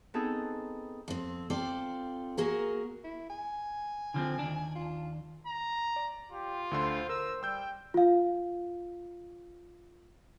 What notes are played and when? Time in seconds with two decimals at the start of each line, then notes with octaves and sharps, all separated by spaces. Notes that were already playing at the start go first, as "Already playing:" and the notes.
0.14 B3 C4 D#4 G#4 A4
1.08 F2 C4
1.50 C4 F4 A4 D5
2.37 A#3 F#4 G#4 A#4
3.04 E4
3.30 G#5
4.14 D3 F3 C4
4.39 D#2 D4
4.75 F4
5.47 A#5
5.96 D5
6.32 F4 G4
6.71 D2 D3 C5 C6
7.09 A#4 E6
7.43 G3 G5 E6 G6
7.94 F4 F5